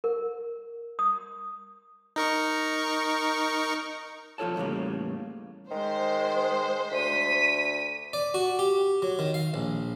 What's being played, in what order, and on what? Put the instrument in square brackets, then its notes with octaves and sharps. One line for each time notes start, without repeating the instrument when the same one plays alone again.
[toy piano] A#4
D#6
[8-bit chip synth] D#4 A#4 C#6
[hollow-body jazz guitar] B1 F3 F4 A4 C#5 A5
E2 A2 C#3 G3 A#3
[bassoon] D#3 [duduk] G#3 [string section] C5
[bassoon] D2 [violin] B6 D#7
[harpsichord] D5
F#4
G4
F#3
D#3
F5
A#1